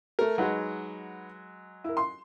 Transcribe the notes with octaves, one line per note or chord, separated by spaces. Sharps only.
A3 A#4
F#3 G#3 D#4 B4 F#5
E4 A#4
C6